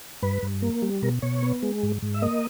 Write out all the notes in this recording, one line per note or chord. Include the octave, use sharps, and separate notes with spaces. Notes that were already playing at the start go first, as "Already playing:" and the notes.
G2 B4
G2
A#3
G3
B2 A#4
B2 C#5
B3
G#3
G#2
G#2
E5
A#3 D#5